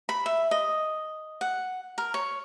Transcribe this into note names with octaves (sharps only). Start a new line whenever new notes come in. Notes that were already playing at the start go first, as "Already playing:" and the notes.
B5
E5
D#5
F#5
A#4
C#5